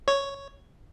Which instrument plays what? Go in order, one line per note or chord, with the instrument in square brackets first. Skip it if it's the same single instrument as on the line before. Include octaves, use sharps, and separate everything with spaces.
[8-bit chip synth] C#5